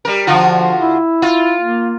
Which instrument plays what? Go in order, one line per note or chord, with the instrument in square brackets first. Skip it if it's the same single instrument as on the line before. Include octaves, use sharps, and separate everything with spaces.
[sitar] G3 A#4
[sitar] D3 F4 F#4 [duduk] F3
[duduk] E4
[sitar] F4
[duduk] A#3